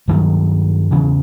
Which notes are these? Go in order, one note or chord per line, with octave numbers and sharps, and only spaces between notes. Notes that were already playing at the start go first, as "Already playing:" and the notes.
G2 D#3 F#3 A#3
E2 C#3 E3